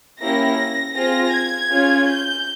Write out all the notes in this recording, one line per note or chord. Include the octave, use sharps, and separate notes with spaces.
A#3 C#4 E4 G4 A#6
C4 F4 G#4 A#6
G#6
C#4 F4 G#4
G6